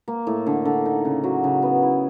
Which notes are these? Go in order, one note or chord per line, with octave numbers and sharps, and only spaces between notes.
A#3
A2
D3
D3
D#4
C#3
F#3
C#3
B3
E4